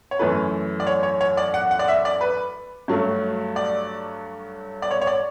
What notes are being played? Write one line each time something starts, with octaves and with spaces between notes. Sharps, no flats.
C#5
F#2 E3 A3 B4
D5
C#5
C#5
C#5
D5
F#5
F#5
D5
E5
D5
B4
G2 F#3 A3
D5
D5
C#5
C#5
D5